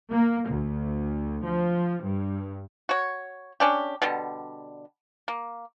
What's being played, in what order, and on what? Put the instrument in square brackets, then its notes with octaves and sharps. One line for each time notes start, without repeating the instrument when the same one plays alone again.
[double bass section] A#3
D2
F3
G2
[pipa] F#4 C#5
C#4 D4 G4
B2 D3 G3
A#3